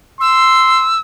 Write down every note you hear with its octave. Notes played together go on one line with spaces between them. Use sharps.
C6 E6